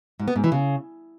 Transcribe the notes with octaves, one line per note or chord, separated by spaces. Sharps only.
G#2
B3
G#2
E3
C#3